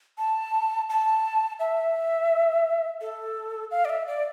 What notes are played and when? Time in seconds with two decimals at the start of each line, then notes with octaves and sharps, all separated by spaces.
0.18 A5
0.89 A5
1.59 E5
3.01 A4
3.71 F5
3.85 D5
3.89 E5
4.07 D5